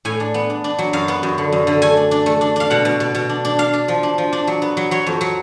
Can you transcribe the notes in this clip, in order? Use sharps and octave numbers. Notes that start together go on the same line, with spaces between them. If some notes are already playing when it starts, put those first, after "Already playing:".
A2 G#5
D4
B3
D4
D4
F#3
F#2 F5
B3
F#2
D3
F#2
D3
A3 G#5
D4
D4
A3
D4
D4 F5
B2 F#5
B2
B2
B2
D4
D4
D4 F5
D4
F3
D4
F3
D4
F#3
B3
F#3
F#3 C#5
F2
F#3